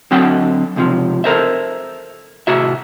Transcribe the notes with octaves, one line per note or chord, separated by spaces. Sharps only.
D3 F#3 C4 F#5 G5
C#2 C3 F3
A4 A#4 C5 E5
A2 C3 F#4 E5